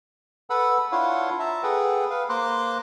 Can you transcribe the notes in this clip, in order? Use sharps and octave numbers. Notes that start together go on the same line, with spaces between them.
A4 B4 F#5 B5 E6
D4 E4 F4 C#5 F5 F#5
E5 A5 A#5
G#4 A4 B4 F#5 G5
B4 F5
A#3 C5 A#5 C6 D6 F#6